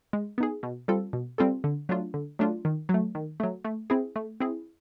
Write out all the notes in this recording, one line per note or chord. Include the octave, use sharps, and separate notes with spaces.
G#3
B3 D#4 G#4
B2
G3 C4 F4 A4
B2
G3 C4 F4 A4
D3
F#3 A3 D4 F4
D3
F#3 A3 D4 F4
D#3
F#3
A3
D#3
F#3 A3
A3
C4 E4 G#4
A3
C4 E4 G#4